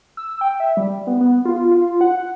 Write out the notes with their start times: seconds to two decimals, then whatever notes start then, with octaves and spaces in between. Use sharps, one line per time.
0.17 E6
0.41 G5
0.60 E5
0.77 G3
1.07 B3
1.21 B3
1.45 F4
1.71 F4
2.01 F#5